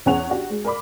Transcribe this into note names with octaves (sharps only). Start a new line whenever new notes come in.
E2 C#4 G#4 F#5 C#6 F7
D4 F#4 G4
G#3
A#4 D5 B5 D6